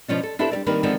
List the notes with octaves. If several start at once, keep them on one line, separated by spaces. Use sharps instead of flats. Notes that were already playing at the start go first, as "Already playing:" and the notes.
B2 F3 C#4 D4
A4
D4 E4 G4 A4 B4 C5
G3 A#4 D5
D#3 G3 A#3 C4 A#4 B4
D3 D#3 F3 G#3 B3 C4